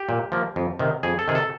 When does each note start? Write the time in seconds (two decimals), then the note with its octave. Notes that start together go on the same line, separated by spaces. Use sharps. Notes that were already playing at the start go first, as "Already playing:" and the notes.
Already playing: G4
0.09 A#2
0.32 F3 A#3
0.56 F2
0.79 C3 D#3
1.03 F2 G#4
1.19 A4
1.28 C3 D#3 G#4
1.35 A4